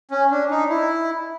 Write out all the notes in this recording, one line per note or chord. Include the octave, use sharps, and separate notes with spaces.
C#4
D4
D#4
E4